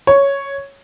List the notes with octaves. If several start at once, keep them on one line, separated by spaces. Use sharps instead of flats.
C#5